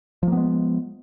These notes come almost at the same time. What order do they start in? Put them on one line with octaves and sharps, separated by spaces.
F3 A#3 B3 G#3